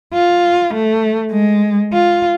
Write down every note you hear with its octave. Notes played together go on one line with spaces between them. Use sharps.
F4
A3
G#3
F4